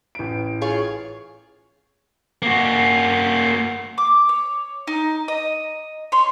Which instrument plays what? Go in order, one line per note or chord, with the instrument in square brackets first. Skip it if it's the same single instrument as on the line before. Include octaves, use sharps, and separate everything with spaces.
[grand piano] A1 D7
[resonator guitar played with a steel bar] F4 G#4 C#5
[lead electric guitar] A#3 F#4
[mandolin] D6
C#5
D#4
D#5
C#5 C6